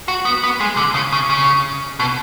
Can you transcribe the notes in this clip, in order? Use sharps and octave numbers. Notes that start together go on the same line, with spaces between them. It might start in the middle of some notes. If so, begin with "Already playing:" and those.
F#4
B3
B3
G#3
D3
C#3
C#3
C#3
B2